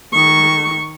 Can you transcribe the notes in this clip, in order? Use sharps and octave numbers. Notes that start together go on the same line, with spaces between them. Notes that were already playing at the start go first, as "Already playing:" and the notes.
D#3 C#6